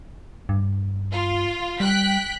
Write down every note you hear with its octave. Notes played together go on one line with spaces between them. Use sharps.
G2
F4
G3 G5 F#6 B6